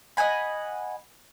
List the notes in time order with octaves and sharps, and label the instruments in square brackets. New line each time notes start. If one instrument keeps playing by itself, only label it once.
[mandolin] D#5 F#5 G#5 B5